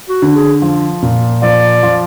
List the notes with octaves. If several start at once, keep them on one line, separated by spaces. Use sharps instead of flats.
F#4
D3
G#4
F3
A#2
F3 D5
F3